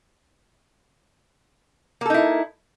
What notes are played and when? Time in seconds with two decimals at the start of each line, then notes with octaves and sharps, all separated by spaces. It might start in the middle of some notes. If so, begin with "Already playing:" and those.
2.01 A#3
2.06 A4
2.10 D#4
2.14 E4